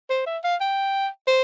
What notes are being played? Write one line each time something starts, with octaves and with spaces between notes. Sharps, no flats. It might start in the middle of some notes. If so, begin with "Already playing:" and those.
C5
E5
F5
G5
C5